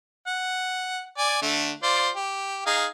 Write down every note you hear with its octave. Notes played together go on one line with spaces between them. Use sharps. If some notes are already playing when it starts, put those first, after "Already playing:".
F#5
D5 G#5
D3 A3
F4 C5 D5
G4
D#4 G#4 F5